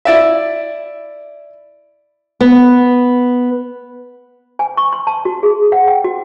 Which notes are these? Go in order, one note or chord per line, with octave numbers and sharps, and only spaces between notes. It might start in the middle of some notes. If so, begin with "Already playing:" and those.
E4 D5 E5
B3
G#5
C#6
C6
A5
F#4
G#4
F#5
G5
F#4